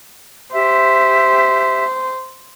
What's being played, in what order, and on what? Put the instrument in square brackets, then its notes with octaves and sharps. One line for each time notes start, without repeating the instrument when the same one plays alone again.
[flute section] G4 E5 [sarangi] C5